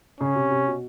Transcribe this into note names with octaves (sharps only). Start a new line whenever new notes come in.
C#3 C#4
C3
C3
B2